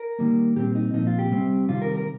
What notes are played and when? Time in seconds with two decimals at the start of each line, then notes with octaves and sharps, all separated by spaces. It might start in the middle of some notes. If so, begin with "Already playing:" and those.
Already playing: A#4
0.19 D#3 G3 A#3
0.56 A#2 G3 C4 G4
0.75 D#4
0.94 A#2 F3 C4 D#4
1.07 F4
1.19 G4
1.31 C3 G3 C4
1.69 C3 D#3 G3 F4
1.82 A#4
1.95 A#4